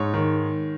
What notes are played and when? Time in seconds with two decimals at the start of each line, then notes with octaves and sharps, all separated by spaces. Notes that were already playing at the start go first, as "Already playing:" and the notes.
Already playing: G#2 C#5
0.14 D#3